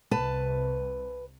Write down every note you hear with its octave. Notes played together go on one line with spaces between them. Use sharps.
C2 C3 B4 A5